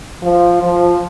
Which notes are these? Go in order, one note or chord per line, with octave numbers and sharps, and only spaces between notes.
F3
F3